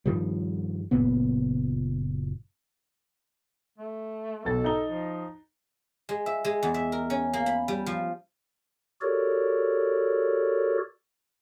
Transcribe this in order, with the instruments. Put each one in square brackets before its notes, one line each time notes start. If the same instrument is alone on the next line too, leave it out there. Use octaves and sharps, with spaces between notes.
[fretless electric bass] G2 D#3 F3 G3
F#1 F#2 A#2 B3
[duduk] A3
[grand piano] B1 B2 A6 [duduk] A4
[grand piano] D#4 A#5 G7
[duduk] F3
[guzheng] G#3
E5
G#3
E2
E5
A#4
C#4
A#3
B5
G3
F3
[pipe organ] F#4 G4 A4 A#4 C#5 D5